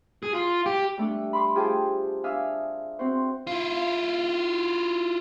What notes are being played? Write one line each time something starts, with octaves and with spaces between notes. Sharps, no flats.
G#4
F4
G4
G3 A3 D4
B5 C6 D6
F4 G4 G#4 C5 G5 A5
D4 E5 F5 G#5 D#6
C4 F#4 C5
E4 F4